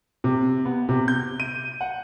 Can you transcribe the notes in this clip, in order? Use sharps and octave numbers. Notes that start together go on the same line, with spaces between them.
C3
B3
C3
G6
D#7
F#5